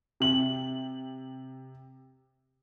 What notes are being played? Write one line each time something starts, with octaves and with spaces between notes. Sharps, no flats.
C3 F#7